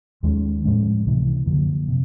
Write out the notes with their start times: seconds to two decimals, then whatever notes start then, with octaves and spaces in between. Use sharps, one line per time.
0.23 D#2 D#3 G#3 C#4
0.64 A2 F3 G#3 C#4
1.06 C#2 C3 E3
1.46 F#2 D3 F3 A#3
1.88 C3